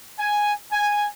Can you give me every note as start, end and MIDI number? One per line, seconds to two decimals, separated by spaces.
0.20 0.53 80
0.72 1.08 80